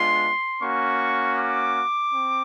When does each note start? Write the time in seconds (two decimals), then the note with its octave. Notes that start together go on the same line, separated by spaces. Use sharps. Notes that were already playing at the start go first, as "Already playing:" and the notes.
Already playing: G#3 B3 D4 F4 C6
0.61 A#3 C#4 F#4 C#6
1.37 D6
2.13 C4